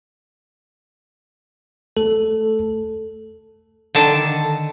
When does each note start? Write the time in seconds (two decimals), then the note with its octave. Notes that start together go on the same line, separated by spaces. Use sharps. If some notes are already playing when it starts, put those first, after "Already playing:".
1.97 A3 A4
3.95 D3 D#3 A5